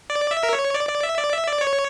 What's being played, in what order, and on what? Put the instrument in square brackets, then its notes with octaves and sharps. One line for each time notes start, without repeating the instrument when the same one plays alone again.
[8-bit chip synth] D5
E5
A#4
C#5
D5
D5
E5
D5
E5
D5
C#5